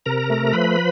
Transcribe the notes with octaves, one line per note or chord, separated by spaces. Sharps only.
C3 A#4 A#5
A3
F3 B4 B5